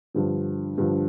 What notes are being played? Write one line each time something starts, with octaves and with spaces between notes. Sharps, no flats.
G2 D3 F3
G2 D3 F3